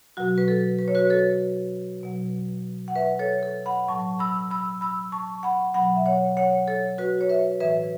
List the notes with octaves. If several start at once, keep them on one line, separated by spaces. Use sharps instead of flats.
B2 F#3 F#4
B4
A4
B4
C#5
F#4 B4
A4 C#5
B2 F#3
F#5
B4 E5
A4 C#5
A4
F#5 B5
A2 F#3 A5 C#6
B5 E6
B5 E6
B5 E6
A5 C#6
F#5 B5
B2 F#3 F#5 B5
E5
C#5 F#5
C#5 F#5
A4 C#5
F#4 B4
C#5
B4 E5
A2 E3 B4 E5